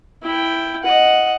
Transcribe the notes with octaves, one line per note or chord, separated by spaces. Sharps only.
E4 G5
D#5 F#5